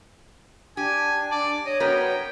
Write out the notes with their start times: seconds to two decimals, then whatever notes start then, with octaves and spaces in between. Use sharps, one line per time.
0.77 D4 G4 G#5
1.31 D5
1.66 C#5 D#5
1.80 F#3 B3 A#4 G5